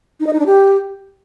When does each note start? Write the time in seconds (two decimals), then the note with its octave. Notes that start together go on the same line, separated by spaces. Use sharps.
0.20 D#4
0.27 D#5
0.33 D#4
0.40 D4
0.46 G4